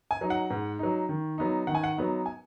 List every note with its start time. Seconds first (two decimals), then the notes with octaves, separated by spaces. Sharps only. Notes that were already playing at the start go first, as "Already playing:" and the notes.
0.11 G#5
0.21 F#3 D#4
0.30 F#5
0.50 G#2
0.79 F#3 D#4
1.09 D#3
1.38 F#3 B3 D#4
1.67 D#3 F#5
1.75 G#5
1.84 F#5
1.97 F#3 B3 D#4
2.26 G#5